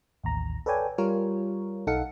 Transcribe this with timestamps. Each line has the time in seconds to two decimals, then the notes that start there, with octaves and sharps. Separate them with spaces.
0.24 A1 D#2 A#5
0.66 A4 B4 C#5 D5 G5 G#5
0.98 G3 F4 A#4 C#5
1.87 B1 D#4 A4 F5 F#5 C#7